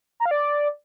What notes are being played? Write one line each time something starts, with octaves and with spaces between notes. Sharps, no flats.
A#5
F5
D5